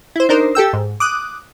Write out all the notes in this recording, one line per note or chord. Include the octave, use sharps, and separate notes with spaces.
E4 C5
D4 D#4 A#4 C5
G4 A4 G5 E6
G#2
D6 D#6 F#6